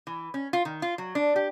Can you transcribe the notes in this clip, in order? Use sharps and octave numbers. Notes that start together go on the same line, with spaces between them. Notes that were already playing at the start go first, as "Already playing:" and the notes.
E3
C#4
F4
D#3
F4
F#3
D4
G4